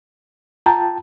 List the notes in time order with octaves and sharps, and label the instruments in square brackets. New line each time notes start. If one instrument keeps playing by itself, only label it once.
[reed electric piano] F4 G5 A5 [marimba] A#5